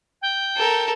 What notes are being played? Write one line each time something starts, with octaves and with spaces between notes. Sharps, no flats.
G5
A4 A#4